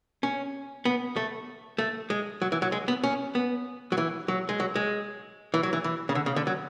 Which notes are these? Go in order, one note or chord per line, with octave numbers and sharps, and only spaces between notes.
C#4
B3
A3
A3
G#3
F#3
E3
F#3
G#3
B3
C#4
B3
F#3
E3
F#3
G#3
F#3
G#3
E3
F#3
E3
E3
C#3
D3
C#3
D3
F#3